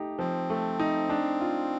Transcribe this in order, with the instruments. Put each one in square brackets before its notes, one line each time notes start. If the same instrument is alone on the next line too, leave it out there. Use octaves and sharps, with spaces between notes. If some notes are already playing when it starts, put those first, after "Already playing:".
Already playing: [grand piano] A3 D#4 G4
[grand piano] F3 [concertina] C4
[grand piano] A3
D#4
D4
F4